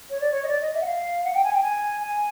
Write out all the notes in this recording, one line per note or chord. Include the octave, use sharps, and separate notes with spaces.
C#5
D5
C#5
D#5
D5
D#5
E5
F#5
F5
F#5
G5
G#5
G5
G#5
G#5